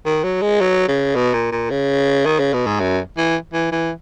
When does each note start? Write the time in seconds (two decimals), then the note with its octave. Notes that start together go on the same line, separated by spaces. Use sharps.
0.06 D#3
0.24 F#3
0.42 G#3
0.60 F#3
0.88 C#3
1.15 B2
1.34 A#2
1.52 A#2
1.70 C#3
2.25 D#3
2.39 C#3
2.53 B2
2.66 G#2
2.80 F#2
3.17 E3
3.53 E3
3.72 E3